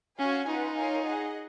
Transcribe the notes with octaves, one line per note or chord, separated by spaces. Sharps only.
C#4 F#4 C#5 F5 G#5
D#4 F4 B4 F#5
F4 A#4 C#5 F5 G#5
G#4 D#5 F#5